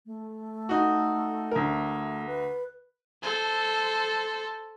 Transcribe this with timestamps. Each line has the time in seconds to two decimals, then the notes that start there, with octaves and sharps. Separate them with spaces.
0.06 A3
0.69 D#4 F#4
1.51 D2 A#4
2.27 B4
3.23 A4 C5